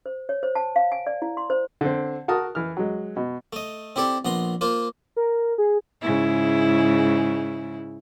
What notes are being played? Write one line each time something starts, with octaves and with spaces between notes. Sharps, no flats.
C5
C#5
C5
A5
F5
G#5
D5
E4
C6
C5
D3 C4
F#4 A#4 A5 D#6
E3 F6
F#3 G#3
B2
A3 D#5
C4 E4 G4 A4 D5
A#1 B3 A#5 C6
A#3 F4 C5
A#4
G#4
G#2 C#3 E4